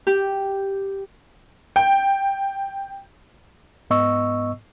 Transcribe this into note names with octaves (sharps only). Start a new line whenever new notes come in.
G4
G5
G#2 B3 D#5 C#6 E6